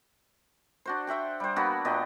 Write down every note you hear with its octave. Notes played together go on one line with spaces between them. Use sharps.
D4 F#4 C5
C5 E5 F#5 G5
G3 C5
A#3 B3 D4 F#4
A#2 B3 G4 D#5